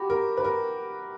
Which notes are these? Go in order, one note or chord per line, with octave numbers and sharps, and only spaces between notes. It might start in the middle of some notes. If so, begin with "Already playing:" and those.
Already playing: F#4 G4 B5 D6 A#6
A#4
B4
A#4